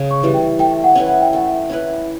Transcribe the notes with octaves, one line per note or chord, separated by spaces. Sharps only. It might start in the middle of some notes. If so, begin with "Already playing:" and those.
Already playing: C#3
C#6
E3 G3
G5
A3 G5
F#5
C#4 E4 B4
F#5
G5
A3 F#5
C#4 E4 B4